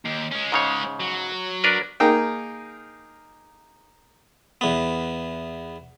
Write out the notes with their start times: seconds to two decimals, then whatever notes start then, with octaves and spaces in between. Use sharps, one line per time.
0.06 D#2
0.32 G#3 C#4
0.52 G#2 C#3 C#5
1.00 F#3
1.64 D4 A#4 B4
2.00 A#3 D#4 G#4 A#4 G5
4.61 E2 B3